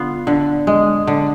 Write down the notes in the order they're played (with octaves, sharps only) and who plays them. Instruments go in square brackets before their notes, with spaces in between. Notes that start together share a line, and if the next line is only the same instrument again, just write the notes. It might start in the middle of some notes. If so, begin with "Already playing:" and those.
Already playing: [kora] D3 B3 F4
D3
G#3
D3